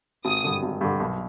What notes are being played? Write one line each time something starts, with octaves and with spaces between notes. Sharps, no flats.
G#1 D#6
G2 D3
G#1
G2 D3
B1